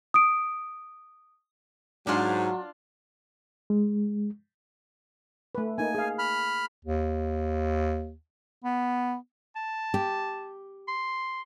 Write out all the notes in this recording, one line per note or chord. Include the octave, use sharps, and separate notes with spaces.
D#6 D7
G#2 F#3 D4 F4
G#3
A3 B4
A#3 D#4 G#5
G#4 F5
B5 F6
D#2
B3
A5
G4
C6